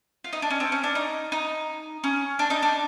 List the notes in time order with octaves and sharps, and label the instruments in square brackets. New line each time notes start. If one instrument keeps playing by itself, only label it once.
[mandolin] F4
D#4
D4
C#4
C4
C#4
D4
D#4
D#4
C#4
D4
D#4
D4